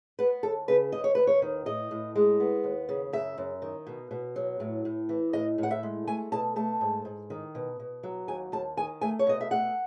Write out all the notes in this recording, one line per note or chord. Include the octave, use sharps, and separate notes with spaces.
B3 B4
D#2 A4
C#3 B4
D#2 D#5
C#5
D#2 B4
C#5
D#3
A2 D#5
A2
G#3
B3
D#2
C#3
F#2 E5
F#2
D#3
B2
B2
F#3
A2
A2
E3
A2 D#5
A2 F#5
E5
G#3
A3 G#5
B2 A5
A3 A5
G#2
G#2
D#3
B2
B2
F#3
D#2 G#5
D#2 A5
D#3 G#5
A3 G#5
C#5
B2 D#5
E5
A3 F#5